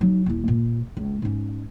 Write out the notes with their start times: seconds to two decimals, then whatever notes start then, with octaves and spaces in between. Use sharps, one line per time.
0.01 F#3 D#4
0.26 D#1 E4
0.48 A#2
0.97 C#2
1.22 G#2 C#4